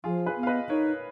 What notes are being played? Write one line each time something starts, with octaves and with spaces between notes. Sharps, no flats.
F3 F4 G#4
G#4 B4
B3
F5
B4 D#5
D#4 A#4 C#5